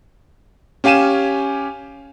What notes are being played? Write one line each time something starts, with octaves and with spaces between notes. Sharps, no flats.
C#4 G4 F5 G#5 D#7 E7